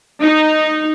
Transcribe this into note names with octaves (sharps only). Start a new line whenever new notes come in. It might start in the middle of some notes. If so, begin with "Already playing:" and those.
D#4